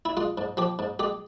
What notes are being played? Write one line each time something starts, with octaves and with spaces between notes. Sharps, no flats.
E4
G#3 F4
G#2
F3 G4
G#2
G#3 G4